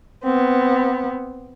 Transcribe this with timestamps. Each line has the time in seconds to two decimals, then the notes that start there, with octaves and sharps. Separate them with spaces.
0.23 B3 C4